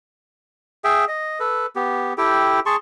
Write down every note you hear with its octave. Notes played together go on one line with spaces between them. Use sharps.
G#4 E5 G5
D#5
A4 B4
B3 G4
E4 G4 A4 G5
G#4 A5 C6 C#6